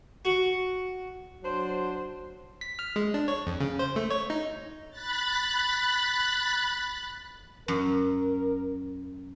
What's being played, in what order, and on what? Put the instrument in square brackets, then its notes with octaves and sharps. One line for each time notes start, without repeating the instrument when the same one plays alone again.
[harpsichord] F#4
[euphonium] F#3 [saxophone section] D4 C5
[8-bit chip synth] B6
F6
G#3
D4
C#5
F2
C#3
C5
A3
C#5
D#4
[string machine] B5 F#6 A6
[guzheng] F#2 [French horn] A#4